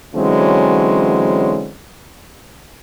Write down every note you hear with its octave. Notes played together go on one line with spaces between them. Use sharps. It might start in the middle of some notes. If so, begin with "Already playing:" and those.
D3 E3 F#3 G#3 C4 C#4